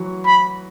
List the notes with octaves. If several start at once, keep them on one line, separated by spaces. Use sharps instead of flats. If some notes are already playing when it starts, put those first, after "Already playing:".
Already playing: E3 F#3 F#4
B5